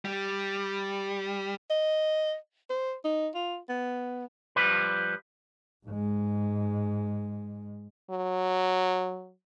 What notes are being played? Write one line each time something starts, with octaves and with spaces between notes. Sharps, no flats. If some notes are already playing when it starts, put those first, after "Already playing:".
G3
D#5
C5
D#4
F4
B3
F3 G3 B4
G#2 G#3
F#3